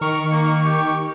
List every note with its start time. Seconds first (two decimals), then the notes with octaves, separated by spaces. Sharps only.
0.01 D#3 A#4 C#6
0.32 A#3
0.65 G4